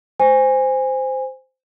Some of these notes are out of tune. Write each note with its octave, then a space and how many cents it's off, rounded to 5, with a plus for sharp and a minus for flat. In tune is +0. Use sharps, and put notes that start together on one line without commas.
C5 -10 G#5 -20